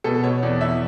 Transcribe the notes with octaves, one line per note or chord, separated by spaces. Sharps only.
B2 A4
B2 C#5
E2 D5
E2 E5